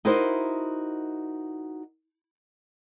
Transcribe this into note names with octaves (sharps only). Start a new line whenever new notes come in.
D#4 E4 F#4 A#4 C5 D#5